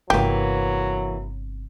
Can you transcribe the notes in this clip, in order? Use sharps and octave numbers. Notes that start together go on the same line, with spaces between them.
G1 C3 E3 F#3 A#3 G4